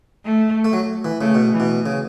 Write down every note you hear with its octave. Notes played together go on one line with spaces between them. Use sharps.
A3
A3
F#3
E3
C#3 A3
B2
E3
B2
C#3